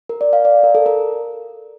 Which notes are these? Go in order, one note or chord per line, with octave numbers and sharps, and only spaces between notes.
A#4
D5
F5
D5
A#4
A4
A#4